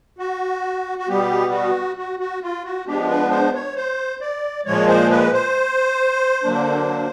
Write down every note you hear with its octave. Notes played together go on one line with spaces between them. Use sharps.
F#4
F#4
B2 G3 B3 G4
F#4
F#4
F#4
F4
F#4
F3 G#3 B3 D4 G4
B4
C5
C#5
C5
D5
A#2 F3 G#3 C#5
C5
B4
C5
D3 F#3 A#3 D4